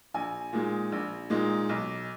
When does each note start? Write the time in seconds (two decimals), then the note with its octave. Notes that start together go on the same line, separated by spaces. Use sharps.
0.14 A#1 G#5
0.53 A#2 G#3 D#4
0.92 A#1
1.30 A#2 G#3 D#4
1.69 B1